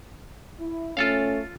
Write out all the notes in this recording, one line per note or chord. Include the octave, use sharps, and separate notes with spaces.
E4
A3 C#4 F4 A4 F5